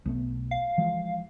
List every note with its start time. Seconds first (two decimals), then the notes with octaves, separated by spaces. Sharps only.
0.06 B1 A3 B3
0.51 F5
0.78 E3 F3 G#3